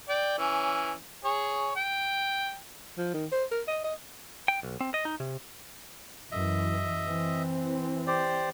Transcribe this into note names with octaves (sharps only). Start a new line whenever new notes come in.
D5 G5
E3 C#4
G#4 C#5
G5
F3
D#3
C5
A#4
D#5
D#5
G5
B1
C4
D#5
D#4
C3
F#2 E3 D#5 E5
E3 C4
G4 C5 D5